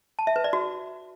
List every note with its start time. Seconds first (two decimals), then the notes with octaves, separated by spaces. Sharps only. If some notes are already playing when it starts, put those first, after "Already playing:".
0.19 A5
0.27 E5
0.36 B4
0.44 D5
0.53 F#4